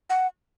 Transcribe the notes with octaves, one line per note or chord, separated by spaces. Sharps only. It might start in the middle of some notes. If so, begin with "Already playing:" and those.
F#5